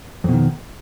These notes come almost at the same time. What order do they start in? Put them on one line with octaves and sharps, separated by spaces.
F2 B2 D#3